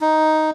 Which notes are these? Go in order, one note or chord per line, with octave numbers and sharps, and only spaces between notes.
D#4